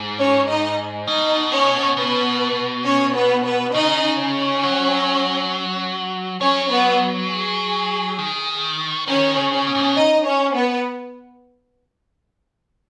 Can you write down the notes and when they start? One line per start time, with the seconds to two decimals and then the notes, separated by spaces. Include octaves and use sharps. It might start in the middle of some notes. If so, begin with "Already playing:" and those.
Already playing: G#2
0.19 C#4 C#5
0.48 D#4 D#5
1.07 B2 D#4 D#5
1.52 C#4 C#5
1.97 B2 B3 B4
2.85 C#4 C#5
3.15 B3 B4
3.45 B3 B4
3.74 C#3 D#4 D#5
4.19 C#4 C#5
4.63 F#3
6.41 F#3 C#4 C#5
6.71 B3 B4
7.30 G#4
8.18 D#3
9.07 D#3 C#4 C#5
9.37 C#3
9.51 C#4
9.67 B2
9.75 G#2
9.82 B2
9.96 D#4 D#5
10.26 C#4 C#5
10.55 B3 B4